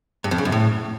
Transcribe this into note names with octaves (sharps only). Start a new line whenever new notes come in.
G2
F2
C#3
F#2
A2